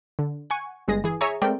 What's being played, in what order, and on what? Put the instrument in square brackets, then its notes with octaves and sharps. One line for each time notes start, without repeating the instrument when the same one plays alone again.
[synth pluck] D3
F#5 G#5 C#6
G1 G2 G#3 G#4 A#6
E3 G#4
G#4 C#5 E5 G#5 A#5 C#6
G#3 A3 C4 A#4 D5 G5